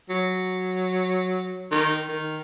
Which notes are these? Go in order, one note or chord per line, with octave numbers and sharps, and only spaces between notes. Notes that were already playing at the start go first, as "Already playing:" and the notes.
F#3
D#3
D#3